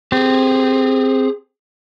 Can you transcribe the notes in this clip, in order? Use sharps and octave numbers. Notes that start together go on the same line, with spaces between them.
C4 G4 G#4